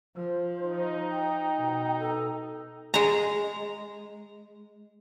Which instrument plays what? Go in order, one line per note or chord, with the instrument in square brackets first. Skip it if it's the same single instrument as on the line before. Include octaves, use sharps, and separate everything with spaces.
[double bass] F3 [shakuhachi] C5
[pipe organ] D#4
[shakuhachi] G5
[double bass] B2
[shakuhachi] A4
[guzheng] G#3 A#5